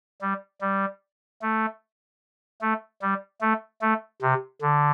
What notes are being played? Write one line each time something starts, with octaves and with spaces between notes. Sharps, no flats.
G3
G3
A3
A3
G3
A3
A3
C3
D3